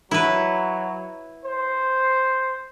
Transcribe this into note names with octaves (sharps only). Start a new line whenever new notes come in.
F#3 E4 B4
C5